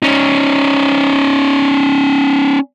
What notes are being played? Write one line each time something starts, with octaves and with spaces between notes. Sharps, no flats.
C#4 D#4